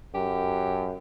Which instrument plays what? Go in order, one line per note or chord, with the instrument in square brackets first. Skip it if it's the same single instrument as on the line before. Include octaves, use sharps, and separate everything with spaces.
[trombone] F#2 [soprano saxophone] G4